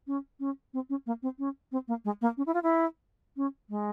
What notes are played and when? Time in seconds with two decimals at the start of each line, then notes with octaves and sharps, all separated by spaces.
0.07 C#4
0.40 C#4
0.74 C4
0.90 C#4
1.06 A#3
1.23 C4
1.39 C#4
1.72 C4
1.88 A#3
2.05 G#3
2.21 A#3
2.37 C#4
2.46 E4
2.54 F4
2.63 E4
3.37 C#4
3.70 G#3